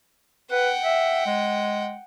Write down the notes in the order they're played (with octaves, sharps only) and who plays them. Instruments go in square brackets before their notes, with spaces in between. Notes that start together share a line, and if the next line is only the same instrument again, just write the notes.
[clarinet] B4 [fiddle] F#5 G5
[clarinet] E5
G#3